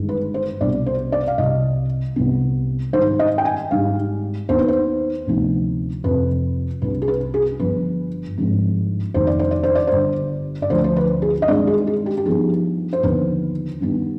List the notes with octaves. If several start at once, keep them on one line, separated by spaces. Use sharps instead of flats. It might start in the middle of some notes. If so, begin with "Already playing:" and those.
Already playing: G1 G2 D#3 G#3
B4
C5
C2 B2 G3 D4 D5
C5
D5
F5
C2 C3 G3 D#5
C2 C3 G3 B3
G#2 D#3 G3 C5
D#5
G5
G#5
G#1 G#2 G3 F5
D#2 D#3 B3 D#4 C5
B4
C5
D2 C3 F3 B3 D#4
F2 C3 F3 B4
C2 C3 G3 D4 B4
G#4
B4
G#4
G1 G2 F3 B3 B4
G#1 G2 F3 G#3 C4
F1 D#2 D#3 G3 C5
D5
C5
D5
C5
D5
C5
G1 G2 D3 G3
D5
D2 D3 F3 C5
C5
B4
G#4
D#5
G2 D#3 G#3 C4 D5
G#4
G#4
G4
G4
G2 F3 B3 D#4 G#4
C5
D#2 D3 F3 B3 D4 B4
G2 D#3 G3 B3 D4